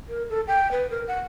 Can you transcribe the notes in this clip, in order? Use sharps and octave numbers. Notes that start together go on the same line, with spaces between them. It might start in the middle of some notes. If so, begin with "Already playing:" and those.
A#4
A4
G5
B4
A#4
F#5